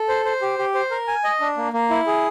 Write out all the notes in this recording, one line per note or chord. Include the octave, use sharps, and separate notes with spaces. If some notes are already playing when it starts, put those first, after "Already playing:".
Already playing: A4
C5
C5
G4
G4
C5
A#4
G#5
D#5
D4
A#3
A#3
E4
G#4